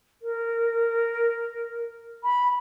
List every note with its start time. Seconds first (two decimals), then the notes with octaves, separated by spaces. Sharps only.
0.22 A#4
2.24 B5